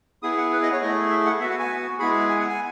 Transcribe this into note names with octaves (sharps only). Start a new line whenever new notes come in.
B3 E4 G#4 D#6
F#5
B4
D#5
C#5
A3 E4 G#4 D#5
E5
F#5
B3 F#4 E5
F#5
G#5
G#3 B3 E4 G#4 B5
G#5
F#5
G#5